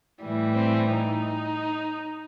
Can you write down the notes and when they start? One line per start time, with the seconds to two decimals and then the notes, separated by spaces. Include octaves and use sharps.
0.23 A2 E3 G3
0.56 C4
0.89 D#4